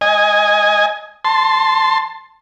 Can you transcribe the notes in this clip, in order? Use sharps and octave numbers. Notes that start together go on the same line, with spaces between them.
D#5 G#5
A5 C6